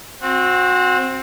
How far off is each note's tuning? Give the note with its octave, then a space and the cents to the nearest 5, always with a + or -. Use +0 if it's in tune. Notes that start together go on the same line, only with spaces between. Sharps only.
C4 +10 F#4 -25